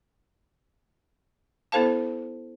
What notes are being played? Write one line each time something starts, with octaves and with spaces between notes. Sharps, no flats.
B3 E4 A4 C5 F5 A5